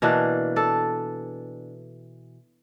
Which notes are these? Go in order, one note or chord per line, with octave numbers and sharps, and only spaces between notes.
B2 E3 A#3 D4
A4 D5